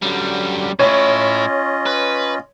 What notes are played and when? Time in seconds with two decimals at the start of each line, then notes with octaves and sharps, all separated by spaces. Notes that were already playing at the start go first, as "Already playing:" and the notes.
0.02 F#2 D3 F#3 G3
0.79 A2 C#4 E4 F4 C#5 D#5
1.86 B4